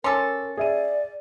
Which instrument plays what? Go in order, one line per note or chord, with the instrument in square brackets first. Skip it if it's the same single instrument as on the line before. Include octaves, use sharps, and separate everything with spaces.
[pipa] C#4 A4 [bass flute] A#4 [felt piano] C6 D6
[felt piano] G#4 E5 D#7 [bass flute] D5